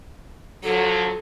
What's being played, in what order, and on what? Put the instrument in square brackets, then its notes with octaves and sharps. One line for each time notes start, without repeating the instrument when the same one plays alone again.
[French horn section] D3 F3 F#3 [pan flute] A4